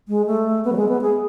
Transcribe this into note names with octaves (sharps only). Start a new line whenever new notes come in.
G#3
A3
B3
F#3
G#3
B3
G#4